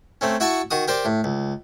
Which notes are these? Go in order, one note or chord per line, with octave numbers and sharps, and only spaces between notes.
A3 C4 C#4
E4 F#4 E5 F#5 A5 C#6
D#3 F#4 D#6
G4 A#4 C5 D5
A2
C#2